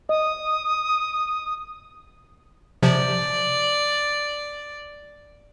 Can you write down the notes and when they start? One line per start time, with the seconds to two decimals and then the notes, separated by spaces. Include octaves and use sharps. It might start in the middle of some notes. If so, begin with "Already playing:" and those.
0.09 D#5 D#6
2.83 C3 F3 D5